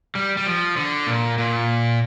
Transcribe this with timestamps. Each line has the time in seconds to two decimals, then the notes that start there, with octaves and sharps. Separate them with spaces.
0.15 G3
0.37 G3
0.46 F3
0.77 D3
1.07 A#2
1.38 A#2